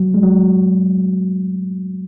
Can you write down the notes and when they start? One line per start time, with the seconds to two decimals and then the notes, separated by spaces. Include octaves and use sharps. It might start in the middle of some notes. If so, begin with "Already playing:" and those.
Already playing: F#3
0.14 G#3
0.23 F#3